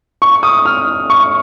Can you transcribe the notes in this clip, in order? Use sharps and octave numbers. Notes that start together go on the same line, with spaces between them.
C#6
D#6
F6
C#6